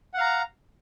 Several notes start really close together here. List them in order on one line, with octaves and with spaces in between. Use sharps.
F#5 F5 A#5